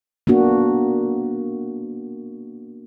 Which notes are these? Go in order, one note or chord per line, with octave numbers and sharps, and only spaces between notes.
A#3 B3 D4 F#4